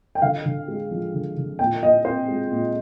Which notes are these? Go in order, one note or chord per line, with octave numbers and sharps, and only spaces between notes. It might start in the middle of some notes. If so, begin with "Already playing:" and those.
G5
D3 F5
D3
G#3
F3
D3
D3
A#2 G5
A#2 D#5
C4 C5
G#3
A#2